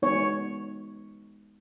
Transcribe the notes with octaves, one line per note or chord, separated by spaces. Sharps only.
G#3 B3 D#4 C#5